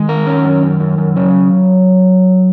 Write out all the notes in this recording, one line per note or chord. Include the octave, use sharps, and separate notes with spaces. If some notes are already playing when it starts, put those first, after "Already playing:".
Already playing: D#3 G#3
A#4
C#4
F#2
F#2
F#2
F#2
C#3 F#3